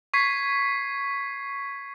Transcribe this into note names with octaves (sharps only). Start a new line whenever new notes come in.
C#6 G#6 B6 C7